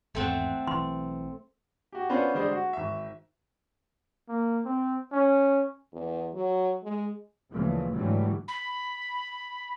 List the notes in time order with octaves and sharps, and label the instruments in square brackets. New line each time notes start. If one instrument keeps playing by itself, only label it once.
[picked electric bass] G#1 E2 [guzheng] A3 C4 F#5
[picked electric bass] B1 E3 [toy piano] C6
[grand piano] F#4 G4
B3 C#4 D4 F4 B4 C5
D3 G3 G#3 C5 D5 D#5
F#4
G#1 E5
[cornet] A#3
C4
C#4
[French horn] E2
F#3
G#3
[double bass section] D2 A#2 C#3 E3 F3 A3
G#2 D3 E3 F#3 G3 A3
[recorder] B5